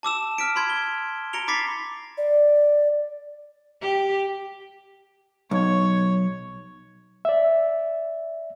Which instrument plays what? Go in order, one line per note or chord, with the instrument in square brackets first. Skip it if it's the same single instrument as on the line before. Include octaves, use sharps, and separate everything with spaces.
[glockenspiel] A5 D6 E6 E7
F6 B6 D7
B5 C6 G#6
G7
A#5 A#6 C#7 D7 F7 G7
B5 D6 A6 B6 C7
[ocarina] D5
[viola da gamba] G4
[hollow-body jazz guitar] B1 [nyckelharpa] C#5
[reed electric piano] D5 E5